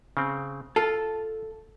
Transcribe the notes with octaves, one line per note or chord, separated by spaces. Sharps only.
C#3 C4
F4 A4